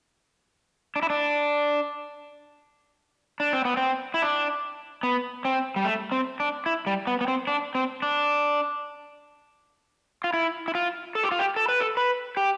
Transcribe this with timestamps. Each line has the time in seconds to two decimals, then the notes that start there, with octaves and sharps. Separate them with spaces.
0.96 D4
1.03 E4
1.10 D4
3.40 D4
3.53 C4
3.65 B3
3.77 C4
4.14 E4
4.22 D4
5.03 B3
5.45 C4
5.76 G3
5.85 A3
6.12 C4
6.40 D4
6.66 E4
6.87 G3
7.07 B3
7.21 B3
7.28 C4
7.47 D4
7.75 C4
8.02 D4
10.24 F4
10.34 E4
10.68 E4
10.75 F4
11.15 A4
11.23 G4
11.32 F4
11.39 G4
11.56 A4
11.69 B4
11.80 A4
11.97 B4
12.37 G4